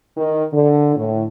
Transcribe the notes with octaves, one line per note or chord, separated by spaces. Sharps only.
D#3
D3
A2